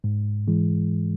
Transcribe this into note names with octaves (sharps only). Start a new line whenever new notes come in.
G#2
E3 G#3